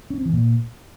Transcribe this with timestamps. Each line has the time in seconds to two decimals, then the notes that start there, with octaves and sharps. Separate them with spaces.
0.10 C#4
0.18 C4
0.25 E3
0.33 A#2